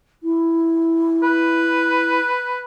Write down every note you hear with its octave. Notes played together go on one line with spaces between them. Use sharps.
E4
B4